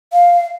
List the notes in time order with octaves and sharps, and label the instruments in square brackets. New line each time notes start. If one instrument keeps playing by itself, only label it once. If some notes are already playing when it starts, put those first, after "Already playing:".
[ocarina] F5